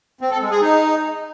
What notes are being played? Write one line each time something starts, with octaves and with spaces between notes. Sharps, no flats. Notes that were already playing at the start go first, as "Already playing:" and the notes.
C4
A4
G#3
G#4
D#4